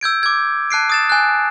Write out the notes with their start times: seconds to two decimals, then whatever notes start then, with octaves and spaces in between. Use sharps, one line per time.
0.01 E6 G6 G#6 D7
0.23 D6 G#6
0.70 A5 F#6 C7 D7
0.90 D#6 A6 E7
1.10 G#5 F#6